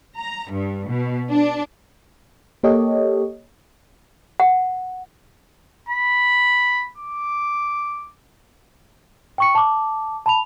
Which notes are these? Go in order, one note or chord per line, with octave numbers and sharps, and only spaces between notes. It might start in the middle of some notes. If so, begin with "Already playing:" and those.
A#5
G2
B2
D4
A#3 G4 A4 C#5 D#5
F#5
B5
D6
G5 C#6 C#7
A5 D6
A5 B5 F7